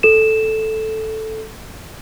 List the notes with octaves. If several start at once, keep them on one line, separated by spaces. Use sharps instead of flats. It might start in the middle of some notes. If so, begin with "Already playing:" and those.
A4 E7